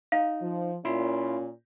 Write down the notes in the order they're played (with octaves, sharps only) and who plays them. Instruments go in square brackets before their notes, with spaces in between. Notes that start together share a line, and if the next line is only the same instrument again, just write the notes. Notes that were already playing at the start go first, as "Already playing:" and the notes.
[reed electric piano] D#4 [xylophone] F5
[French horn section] F3
[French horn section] A#2 C#4 F4 [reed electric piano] E4 B5 C6